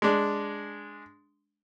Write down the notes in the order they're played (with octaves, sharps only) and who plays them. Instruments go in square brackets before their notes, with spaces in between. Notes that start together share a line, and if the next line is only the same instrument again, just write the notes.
[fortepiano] G#3 D4